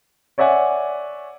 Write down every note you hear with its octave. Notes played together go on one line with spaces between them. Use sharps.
C#5 D5 E5 F#5 G#5